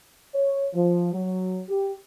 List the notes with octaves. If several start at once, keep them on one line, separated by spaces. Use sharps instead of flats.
C#5
F3
F#3
G4